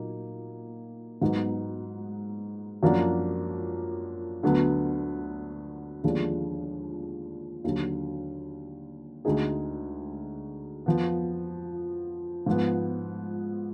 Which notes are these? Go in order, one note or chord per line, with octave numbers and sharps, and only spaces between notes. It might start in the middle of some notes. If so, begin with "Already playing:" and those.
Already playing: A#2 F#3 A#3 D#4
G#2 F#3 B3 D#4
F#2 F3 A#3 D4 F#4
D2 D3 F#3 B3
D#2 D3 F3 G#3 D4
D#2 D3 F#3
D2 D3 G#3 D#4 G#4
F2 F3 B3
G#2 F3 B3